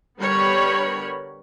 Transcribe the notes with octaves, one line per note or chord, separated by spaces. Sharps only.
D3 G3 B3 A#4 C#5 B5